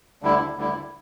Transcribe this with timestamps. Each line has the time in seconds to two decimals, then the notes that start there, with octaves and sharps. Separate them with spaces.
0.22 D2 D3 G3 E4
0.56 D2 D3 G3 E4